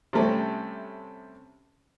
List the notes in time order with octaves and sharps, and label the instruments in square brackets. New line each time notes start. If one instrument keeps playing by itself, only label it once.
[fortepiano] C3 G3 A3 C4 C#4